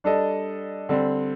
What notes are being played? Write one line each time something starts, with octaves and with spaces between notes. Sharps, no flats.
G3 D4 A4 D#5
D3 G3 C4